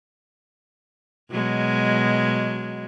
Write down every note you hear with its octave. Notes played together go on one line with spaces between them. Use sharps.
B2 F#3 G#3